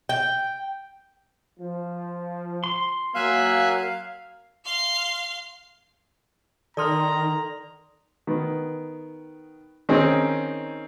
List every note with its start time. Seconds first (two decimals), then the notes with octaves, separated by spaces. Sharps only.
0.09 G5
1.60 F3
2.64 C6
3.15 F#3 A#3 E5 F5 G#5 F#6
4.65 F5 C6
6.77 D#3 A4 D5 A#5 C6 D#6 F6
8.27 D#3 B3
9.89 D#3 C4 C#4 D#4 G#4